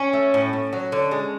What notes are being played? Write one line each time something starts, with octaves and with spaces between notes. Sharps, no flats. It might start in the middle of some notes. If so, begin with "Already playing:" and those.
Already playing: C#4
A3
A2
A2
F#3
D3
G#3